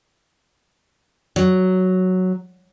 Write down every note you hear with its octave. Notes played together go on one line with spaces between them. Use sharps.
F#3